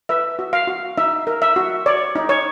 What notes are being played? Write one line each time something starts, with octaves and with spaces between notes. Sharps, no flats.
B4 E5
F#4
F5
F#4
D#4 E5
A#4
E5
F#4
C#5 D5
D#4
C#5